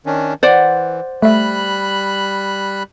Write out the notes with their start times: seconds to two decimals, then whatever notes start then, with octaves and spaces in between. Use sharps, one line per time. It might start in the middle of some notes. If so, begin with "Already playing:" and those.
0.06 D#3 C#4 D4
0.43 E3 C5 D5 F#5
1.22 G3 A3 E5 B5 F#6